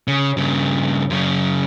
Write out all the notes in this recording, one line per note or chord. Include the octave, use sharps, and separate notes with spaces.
C#3
G2 C#3
F#2 C#3